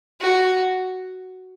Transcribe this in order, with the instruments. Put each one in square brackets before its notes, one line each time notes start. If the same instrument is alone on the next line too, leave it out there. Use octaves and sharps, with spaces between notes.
[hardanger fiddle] F#4